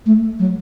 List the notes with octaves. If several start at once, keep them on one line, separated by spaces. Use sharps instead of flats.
A3
F#3